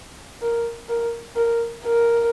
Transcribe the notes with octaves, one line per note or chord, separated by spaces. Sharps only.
A#4
A#4
A#4
A#4